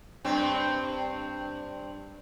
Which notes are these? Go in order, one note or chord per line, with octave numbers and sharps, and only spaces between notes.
G2 C4